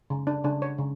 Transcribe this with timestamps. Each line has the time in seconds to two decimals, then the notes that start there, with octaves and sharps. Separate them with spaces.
0.10 C#3
0.27 D4
0.44 C#3 D4
0.62 C#5
0.78 C#3